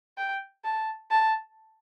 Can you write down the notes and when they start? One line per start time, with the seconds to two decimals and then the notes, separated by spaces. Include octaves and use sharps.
0.18 G5
0.64 A5
1.11 A5